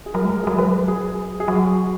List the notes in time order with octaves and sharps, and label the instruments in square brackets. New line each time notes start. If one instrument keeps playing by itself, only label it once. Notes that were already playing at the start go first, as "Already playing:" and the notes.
[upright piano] G#4
[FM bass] F#3 [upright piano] A#4
[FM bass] G#3 [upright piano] A#4
[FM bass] F#3 [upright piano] A#4
[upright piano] G#4
[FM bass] F#3
[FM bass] F#3 [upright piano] B4
[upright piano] G#4
G#4
[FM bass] F#3 [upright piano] F#4